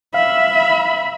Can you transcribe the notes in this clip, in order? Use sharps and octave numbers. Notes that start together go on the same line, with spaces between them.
E5 F5 B5